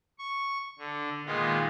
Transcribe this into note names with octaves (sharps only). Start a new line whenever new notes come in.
C#6
D3
A#2 D#3 G#3 B3 F4